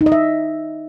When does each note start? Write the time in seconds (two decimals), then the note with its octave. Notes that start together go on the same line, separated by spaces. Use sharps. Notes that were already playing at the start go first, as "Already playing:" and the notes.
0.01 D#4
0.06 D#5
0.12 E5